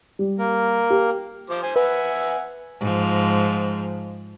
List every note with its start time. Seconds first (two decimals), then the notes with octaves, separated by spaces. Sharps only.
0.19 G3
0.39 A#3 A#4
0.90 G4
1.50 F3 C5 D6
1.63 C5 G#5
1.76 B4 E5 F#5 G#5
2.80 G#2 F3